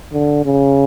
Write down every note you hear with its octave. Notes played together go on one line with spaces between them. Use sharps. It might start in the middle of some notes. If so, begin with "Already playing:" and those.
D3
C#3